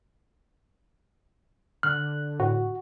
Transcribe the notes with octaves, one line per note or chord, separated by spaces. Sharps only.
D3 F6 F#6
A2 F#4